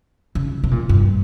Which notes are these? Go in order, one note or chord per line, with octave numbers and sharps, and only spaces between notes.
C#3
C3
A#2
G2